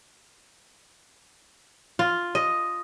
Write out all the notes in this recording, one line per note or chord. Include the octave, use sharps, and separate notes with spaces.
F4
D#5